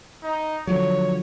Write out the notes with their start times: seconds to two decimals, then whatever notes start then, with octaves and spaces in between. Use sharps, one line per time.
0.24 D#4
0.67 D3 F3 F#3 C#5